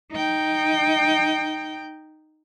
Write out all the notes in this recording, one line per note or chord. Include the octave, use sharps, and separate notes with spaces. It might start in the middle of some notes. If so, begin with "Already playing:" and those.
D#4 G5